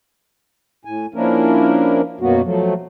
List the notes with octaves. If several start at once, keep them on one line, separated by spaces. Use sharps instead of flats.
A2 G#5
F3 A#3 C#4 D4 E4 A#4
F#2 B2 F#3 A#3 B3 F#4
F3 F#3 A3